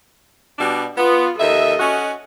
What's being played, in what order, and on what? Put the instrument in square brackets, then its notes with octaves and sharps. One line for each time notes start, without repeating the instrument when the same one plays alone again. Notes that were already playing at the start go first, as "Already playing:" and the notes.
[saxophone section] B2 G3 D4
[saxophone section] B3 [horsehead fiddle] F4
[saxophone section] D#2 E5 [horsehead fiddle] A4 D#5
[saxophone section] C#4 F#4